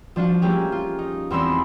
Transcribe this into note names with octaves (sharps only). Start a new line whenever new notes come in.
F3 D4 F4 F#4
A3 A#3 C#4 G4 G#4
F4
D#4
E2 C4 D#4 B5 C6 E6